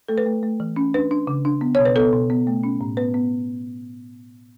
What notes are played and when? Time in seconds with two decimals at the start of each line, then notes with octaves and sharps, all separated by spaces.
0.08 A3 A4
0.18 B4
0.26 A3
0.43 A3
0.60 E3
0.76 C#4
0.94 D4 B4
1.11 D4
1.27 C#3
1.45 D4
1.61 B3
1.75 B2 C#5
1.85 B4
1.96 B3 A4
2.13 B2
2.30 B3
2.47 A3
2.63 C#4
2.81 A2
2.97 B3 B4
3.14 B3